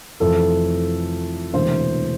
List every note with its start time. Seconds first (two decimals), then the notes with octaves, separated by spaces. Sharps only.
0.20 F1 F2 E3 A4
1.53 E1 D2 C3 E3 C5